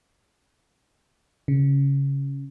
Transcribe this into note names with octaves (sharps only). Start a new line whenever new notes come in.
C#3